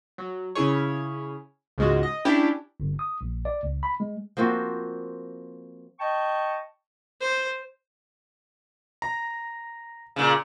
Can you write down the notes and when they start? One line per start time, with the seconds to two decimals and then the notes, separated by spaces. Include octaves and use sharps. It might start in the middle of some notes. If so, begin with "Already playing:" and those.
0.18 F#3
0.55 C#3 C#4 E4 G#4 C#5
1.78 C#2 G#2 G#3 F4 F#4
2.03 D#5
2.25 C#4 D4 E4 G4 G5
2.80 G1
2.99 D#6
3.21 A#1
3.45 D5
3.63 C#2
3.83 B5
4.00 G#3
4.37 F3 A#3 C4 F#4
5.99 D#5 G5 A5 C#6
7.20 C5
9.02 A#5
10.16 A#2 C#3